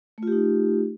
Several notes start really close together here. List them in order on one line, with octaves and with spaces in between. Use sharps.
A3 F4 G4 D#4